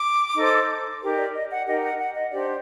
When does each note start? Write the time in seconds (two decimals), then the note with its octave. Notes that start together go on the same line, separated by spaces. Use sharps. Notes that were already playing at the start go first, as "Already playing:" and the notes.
Already playing: D6
0.36 D#4 A4 C5
1.01 D#4 G4 A#4
1.17 D5
1.34 D#5
1.50 F#5
1.66 D#4 G4 A#4 D#5
1.83 F#5
1.99 F#5
2.15 D#5
2.31 D4 G4 C5 D5